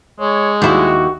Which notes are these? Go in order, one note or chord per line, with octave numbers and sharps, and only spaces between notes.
G#3 C#5
D#2 E4 F#4